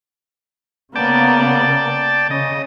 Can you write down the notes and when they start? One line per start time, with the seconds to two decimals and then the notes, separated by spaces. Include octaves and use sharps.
0.96 C#3 A#3 B3 D5 G5 A5
2.31 C#3 D#5